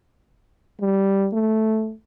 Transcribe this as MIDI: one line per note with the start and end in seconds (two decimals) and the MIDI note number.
0.81 1.28 55
1.33 1.93 57